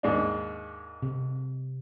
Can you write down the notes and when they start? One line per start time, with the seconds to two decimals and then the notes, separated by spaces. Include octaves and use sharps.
0.03 D#2 G#2 D4
1.02 C3